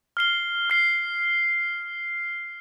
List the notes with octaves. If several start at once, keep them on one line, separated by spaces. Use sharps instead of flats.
F6 C7 G7
F6 C7 G7